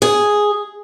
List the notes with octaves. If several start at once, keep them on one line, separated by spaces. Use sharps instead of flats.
G#4